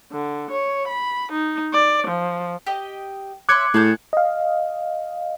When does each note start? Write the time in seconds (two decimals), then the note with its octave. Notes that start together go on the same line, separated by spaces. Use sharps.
0.12 D3
0.51 C#5
0.88 B5
1.32 D#4
1.73 D5
2.08 F3
2.66 G4 D#5
3.49 C#5 E5 C6 D6 F#6 G#6 C#7
3.74 A2 G#4 A5 G6
4.13 D#5 F5